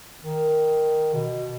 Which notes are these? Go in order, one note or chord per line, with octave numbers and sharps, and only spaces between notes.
D#3
B2